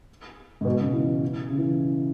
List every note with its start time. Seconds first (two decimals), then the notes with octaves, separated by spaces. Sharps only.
0.61 G#2
0.65 B2
0.80 C#3
0.94 E3
1.50 C#3
1.58 E3